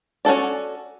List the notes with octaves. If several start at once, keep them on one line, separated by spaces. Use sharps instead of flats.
C#4 F#4 A4 D5